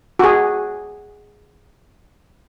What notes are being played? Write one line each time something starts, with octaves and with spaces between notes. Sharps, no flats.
F#4 G#4